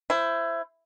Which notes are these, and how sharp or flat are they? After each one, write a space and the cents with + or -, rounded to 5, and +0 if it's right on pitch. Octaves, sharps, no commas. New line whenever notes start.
E4 +20 C5 +0